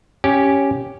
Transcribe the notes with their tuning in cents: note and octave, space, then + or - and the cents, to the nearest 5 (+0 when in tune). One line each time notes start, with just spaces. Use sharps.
C#4 +0 G4 -5